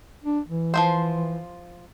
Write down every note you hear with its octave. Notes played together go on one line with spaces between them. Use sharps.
D4
E3
F3 A#3 C5